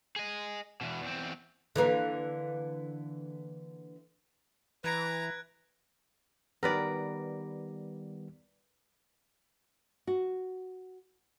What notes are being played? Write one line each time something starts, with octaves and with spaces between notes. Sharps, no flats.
G#4 D#5
E2 B2
E2 C4
D3 E3 A#3
E3 B4 A#5 F#6 G#6 D7
D#3 G3 B3 A#4 B4 D5
F#4